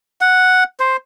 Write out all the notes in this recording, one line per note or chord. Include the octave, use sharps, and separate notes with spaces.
F#5
C5